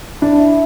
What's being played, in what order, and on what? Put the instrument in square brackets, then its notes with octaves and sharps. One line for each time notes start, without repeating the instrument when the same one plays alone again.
[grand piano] D4 [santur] E4
[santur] E4